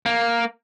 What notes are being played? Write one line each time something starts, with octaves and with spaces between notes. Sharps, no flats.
A#3